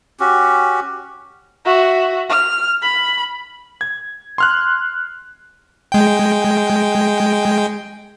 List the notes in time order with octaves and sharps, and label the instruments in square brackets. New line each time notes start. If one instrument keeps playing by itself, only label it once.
[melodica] C#4 F#4 G4
[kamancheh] F#4 E5
F6
B5
[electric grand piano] G#6
C6 F6 F#6
[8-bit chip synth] G#3 G5